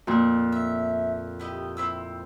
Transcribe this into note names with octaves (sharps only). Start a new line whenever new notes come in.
F2 A#2
E5
E4 G4 D#5
C4 E4 E6